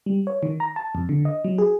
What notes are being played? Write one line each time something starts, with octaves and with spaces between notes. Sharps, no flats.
G3
C#5
D#3
A#5
A5
F2
D3
D#5
F#3
G#4